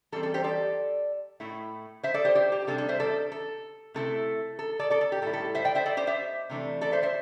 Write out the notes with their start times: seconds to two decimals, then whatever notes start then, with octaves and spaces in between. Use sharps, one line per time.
0.12 E3 G3 C4 A4
0.23 A4
0.34 G4 C5
0.44 A4 D5
1.40 A2 A3 E4
2.03 C5 E5
2.14 A4 D5
2.25 G4 C5
2.35 G4 C5
2.52 G4
2.67 C3 G3 D4 A4
2.78 A4
2.89 C5 E5
3.00 A4 D5
3.32 A4
3.94 C3 A3 E4 A4
4.59 A4
4.79 A4 D5
4.90 A4 D5
5.01 A4
5.12 G4
5.22 A2 A4
5.25 G3 E4
5.33 A4
5.55 C5 E5
5.64 D5 G5
5.75 C5 E5
5.86 A4 D5
5.97 G4 C5
6.07 C5 E5
6.50 C3 E3 A3 D4
6.81 A4 D5
6.92 C5 E5
7.03 C5 E5